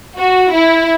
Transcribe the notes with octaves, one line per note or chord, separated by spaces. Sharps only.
F#4
E4